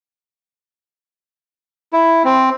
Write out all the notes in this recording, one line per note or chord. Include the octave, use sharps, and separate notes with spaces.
E4
C4